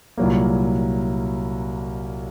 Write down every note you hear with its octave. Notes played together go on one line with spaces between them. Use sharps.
C2 A#2 F#3 A#3